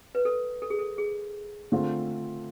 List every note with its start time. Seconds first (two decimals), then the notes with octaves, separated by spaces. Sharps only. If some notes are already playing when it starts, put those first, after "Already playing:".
0.15 B4
0.25 A4
0.62 A4
0.70 G#4
0.79 A4
0.98 G#4
1.72 D3 A3 C4 F4